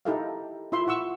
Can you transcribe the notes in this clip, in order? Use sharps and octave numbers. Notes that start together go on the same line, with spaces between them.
D#4 E4 G4 A4 E5 F5
E4 F4 E5 C6
E4 F#5 C#6 E6